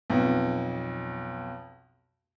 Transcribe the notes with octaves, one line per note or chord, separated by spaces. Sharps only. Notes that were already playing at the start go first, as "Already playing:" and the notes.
B1 F2